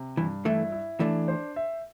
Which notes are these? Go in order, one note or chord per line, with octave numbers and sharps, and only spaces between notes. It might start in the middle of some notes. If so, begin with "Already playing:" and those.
Already playing: C3
G2 E3
E3 A3 E4
E4
E3 A3 D4
C5
E5